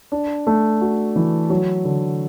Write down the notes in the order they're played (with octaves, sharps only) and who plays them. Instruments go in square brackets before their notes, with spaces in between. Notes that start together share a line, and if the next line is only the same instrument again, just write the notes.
[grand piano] D4
A3
F#4
E3
F#3
D3